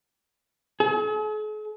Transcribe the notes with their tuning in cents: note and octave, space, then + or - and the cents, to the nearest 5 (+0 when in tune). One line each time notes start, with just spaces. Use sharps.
G#4 +45